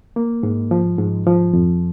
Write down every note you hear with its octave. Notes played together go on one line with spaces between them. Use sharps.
A#3
G#2
F3
G#2
F3
F2